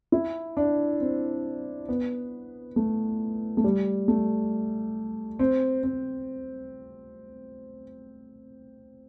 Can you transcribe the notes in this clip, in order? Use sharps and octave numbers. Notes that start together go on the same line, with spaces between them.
E4
D4
C4
B3
A3
A3
G3
A3
C4
C4